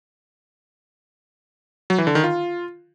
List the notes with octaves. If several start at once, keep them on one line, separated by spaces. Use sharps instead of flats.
F#3
E3
D3
D#3
F4